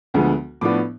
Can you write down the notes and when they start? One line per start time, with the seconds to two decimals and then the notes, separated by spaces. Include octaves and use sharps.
0.14 D2 D3 F3 G#3 B3
0.61 A2 F3 B3 D4 D6